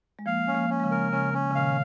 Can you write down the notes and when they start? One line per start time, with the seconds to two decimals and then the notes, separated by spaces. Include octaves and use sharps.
0.19 G#3
0.26 F3 A#3 F5
0.47 C#4
0.55 F3 A#3
0.70 C#4
0.80 G#3
0.83 C#3 F3
0.91 A#4
1.12 C#3 C#4
1.34 C#4
1.51 C#3
1.55 A#2 D#3 F5